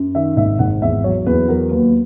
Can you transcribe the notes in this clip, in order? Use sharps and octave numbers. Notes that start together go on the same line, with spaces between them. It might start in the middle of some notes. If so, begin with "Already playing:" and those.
Already playing: F#2
D#3 E5
G#1 E5
G#1 F#5
E2 E5
F#3 C#5
E2 B4
F#3 A#4
D#2 B4